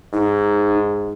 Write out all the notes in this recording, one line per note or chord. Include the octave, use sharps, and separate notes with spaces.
G#2 D#4